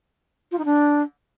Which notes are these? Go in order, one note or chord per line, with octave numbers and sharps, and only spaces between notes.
F4
D#4
D4